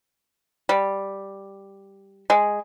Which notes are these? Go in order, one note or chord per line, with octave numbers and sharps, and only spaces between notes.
G3
G#3